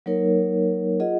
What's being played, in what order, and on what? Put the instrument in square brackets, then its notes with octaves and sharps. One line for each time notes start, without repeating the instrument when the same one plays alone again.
[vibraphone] F#3 A#3 D#4 A#4 C#5
F4 G#4 D#5 F#5